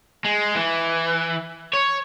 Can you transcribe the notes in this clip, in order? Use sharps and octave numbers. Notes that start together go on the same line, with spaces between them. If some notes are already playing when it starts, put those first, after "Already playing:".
G#3
E3
C#5